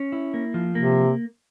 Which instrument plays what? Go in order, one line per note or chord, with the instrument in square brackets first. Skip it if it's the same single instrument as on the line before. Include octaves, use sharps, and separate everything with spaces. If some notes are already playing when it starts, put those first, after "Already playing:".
Already playing: [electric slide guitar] C#4
E4
A#3
F3
[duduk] C3 [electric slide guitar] A#3